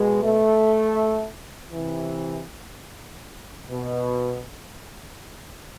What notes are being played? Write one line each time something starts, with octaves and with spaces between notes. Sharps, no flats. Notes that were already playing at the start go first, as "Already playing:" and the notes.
Already playing: B2 G#3
A3
C3 E3
B2